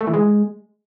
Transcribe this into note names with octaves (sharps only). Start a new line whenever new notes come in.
A3
E3
G#3